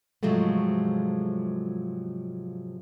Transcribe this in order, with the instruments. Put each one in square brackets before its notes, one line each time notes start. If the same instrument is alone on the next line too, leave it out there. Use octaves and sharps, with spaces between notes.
[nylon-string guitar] G#2 C3 F3 F#3 G#3 A3